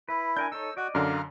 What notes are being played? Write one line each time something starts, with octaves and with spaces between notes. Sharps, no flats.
E4 B4
D4 A#4 G#5 G6
D#4 A4 C#5 E6
F#4 D5 D#5
F#2 D3 F5 A#5 F6